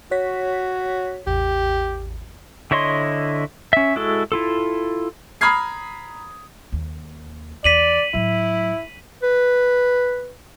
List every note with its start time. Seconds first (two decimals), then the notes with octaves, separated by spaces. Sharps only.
0.11 F#4 C#5 B6
1.27 A1 E2 G4
2.71 D3 E4 C#5 D#5 C6
3.73 C#4 E5
3.96 G#3 E4 F#4 A4
4.32 E4 F4 A4
5.41 A#5 B5 D#6 F6 G#6 C7
6.72 D#2
7.64 E2 D5 B6 D#7 F#7
8.14 A2 F#3 E4
9.23 B4